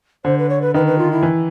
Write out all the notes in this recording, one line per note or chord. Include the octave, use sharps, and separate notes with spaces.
D3 C5
B4
C#5
B4
D#3 B4
B4
F4
E4
E3